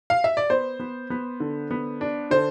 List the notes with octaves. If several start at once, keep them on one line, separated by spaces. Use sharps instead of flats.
F5
E5
D5
B3 C5
B3
B3
D3
B3
D4
D3 C5